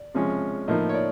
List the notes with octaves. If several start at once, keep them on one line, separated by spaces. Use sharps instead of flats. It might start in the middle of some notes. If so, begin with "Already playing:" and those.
Already playing: D5
C3 F3 G#3 C#4
A2 F3 A#3 D#4 D#5
C#5
D5